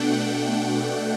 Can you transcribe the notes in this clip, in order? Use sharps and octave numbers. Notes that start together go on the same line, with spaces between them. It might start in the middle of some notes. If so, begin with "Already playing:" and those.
Already playing: B2 A3 D4 F#5 G5
F#5